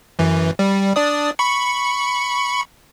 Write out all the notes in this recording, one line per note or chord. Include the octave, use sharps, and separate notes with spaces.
F#2 E3
G3
D4 D5 D#6
B5 C#6 C#7